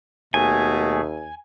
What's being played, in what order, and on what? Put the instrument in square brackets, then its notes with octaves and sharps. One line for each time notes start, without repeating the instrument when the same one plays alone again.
[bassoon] D#2 [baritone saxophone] B2 [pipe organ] A3 G#4 [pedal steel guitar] G#5